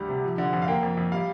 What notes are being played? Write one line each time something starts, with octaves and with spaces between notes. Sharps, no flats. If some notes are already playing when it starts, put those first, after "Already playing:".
Already playing: D2 G3
C3
F3
D3
F2
F5
A#3 G5
F2
F2
G3 F5